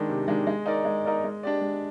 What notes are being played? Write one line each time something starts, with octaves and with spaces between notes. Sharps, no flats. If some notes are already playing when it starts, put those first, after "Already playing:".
Already playing: D#3 G#3 D4
C3
D#3 G#3 D4
G#3
D#4 A#4 D5
G#3
D#4 A#4 D5
G#3
D4 G4 D5
G#3